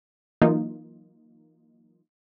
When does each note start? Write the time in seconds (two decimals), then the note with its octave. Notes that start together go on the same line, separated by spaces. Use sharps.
0.42 E3 F#3 A#3 D#4 F4